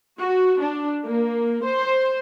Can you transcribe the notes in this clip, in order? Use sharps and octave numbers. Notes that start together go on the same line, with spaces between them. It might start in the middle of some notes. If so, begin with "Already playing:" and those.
F#4
D4
A#3
C5